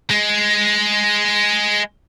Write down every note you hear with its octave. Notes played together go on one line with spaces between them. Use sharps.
G#3